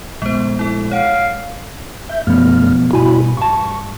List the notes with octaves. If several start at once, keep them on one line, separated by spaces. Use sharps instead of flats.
A#1 G#3 A3 B3 C5
E4 A4
C#5 F5 F#5 D7
E5 G6
B1 F#2 F3 A3 B3 F6
G2 B2 E4 F#4 G#5 B5
G2 A5 C#6